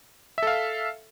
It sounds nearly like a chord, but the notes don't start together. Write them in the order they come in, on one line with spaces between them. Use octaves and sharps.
E5 A4 F5